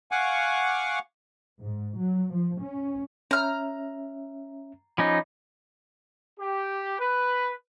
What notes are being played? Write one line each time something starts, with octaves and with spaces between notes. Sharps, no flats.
F5 F#5 G#5 C#6 D6
G#2
F#3
F3
C#4
C#4 E5 A#5 F6
F3 C#4 D#4 B5 D6
G4
B4